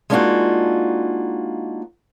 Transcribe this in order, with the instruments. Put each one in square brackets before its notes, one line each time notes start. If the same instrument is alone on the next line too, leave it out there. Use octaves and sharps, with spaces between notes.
[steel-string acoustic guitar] G#3 A#3 D4 D#4 F4 F#4